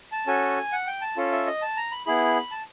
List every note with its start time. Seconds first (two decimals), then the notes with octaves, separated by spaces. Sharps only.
0.12 A5
0.27 C#4 F#4 A4 G#5
0.72 F#5
0.87 G5
1.02 A5
1.17 C#4 F4 A4
1.32 E5
1.47 D#5
1.62 A5
1.77 A#5
1.92 B5
2.06 B3 E4 G#4 B5
2.51 A5